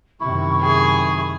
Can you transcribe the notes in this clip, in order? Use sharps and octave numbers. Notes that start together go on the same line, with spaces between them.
F#2 C3 D#3 E4 C#6
G#4